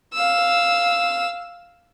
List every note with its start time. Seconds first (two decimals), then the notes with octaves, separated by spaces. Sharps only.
0.14 F5 E6